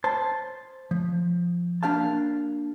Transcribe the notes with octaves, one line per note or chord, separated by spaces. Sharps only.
C5 A5
F3
A#3 D4 G4 F5 A5